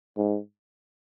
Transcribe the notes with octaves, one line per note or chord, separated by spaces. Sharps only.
G#2